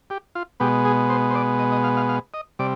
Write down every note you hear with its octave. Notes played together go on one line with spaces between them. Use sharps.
G4
F4
B2 G#3 B3 G4
G#4
C5
C5
D5
D#5
D#5
F5
F5
F5
D#5
C3 G3 D5